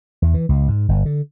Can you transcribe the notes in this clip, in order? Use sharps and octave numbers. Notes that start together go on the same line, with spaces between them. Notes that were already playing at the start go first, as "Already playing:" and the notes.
E2
E3
C#2
G#2
G1
D3